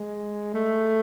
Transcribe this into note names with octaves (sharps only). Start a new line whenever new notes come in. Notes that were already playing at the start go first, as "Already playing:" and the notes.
Already playing: G#3
A3